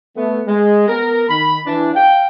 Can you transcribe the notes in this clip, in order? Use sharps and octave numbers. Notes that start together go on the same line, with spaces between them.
A3 B3
G#3
B3 A#4
D#3 B5
E3 D4
F5 G5